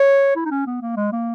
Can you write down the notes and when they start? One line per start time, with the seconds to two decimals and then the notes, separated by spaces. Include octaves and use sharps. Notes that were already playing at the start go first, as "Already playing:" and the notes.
Already playing: C#5
0.36 E4
0.45 D#4
0.51 C#4
0.67 B3
0.82 A#3
0.97 G#3
1.12 A#3